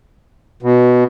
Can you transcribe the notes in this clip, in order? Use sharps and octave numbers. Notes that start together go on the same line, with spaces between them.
B2